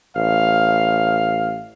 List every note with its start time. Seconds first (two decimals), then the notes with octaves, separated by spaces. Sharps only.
0.16 A1 F5